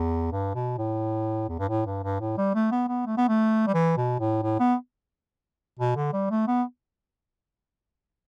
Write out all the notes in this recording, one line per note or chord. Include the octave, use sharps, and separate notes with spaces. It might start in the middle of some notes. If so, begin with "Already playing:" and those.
Already playing: E2
G2
B2
A2
E2
G2
A2
G2
G2
A2
G3
A3
B3
B3
A3
B3
A3
G3
E3
B2
A2
A2
B3
B2
D3
G3
A3
B3